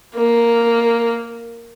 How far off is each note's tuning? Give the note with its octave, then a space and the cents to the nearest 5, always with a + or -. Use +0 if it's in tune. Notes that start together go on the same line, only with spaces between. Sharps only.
A#3 +0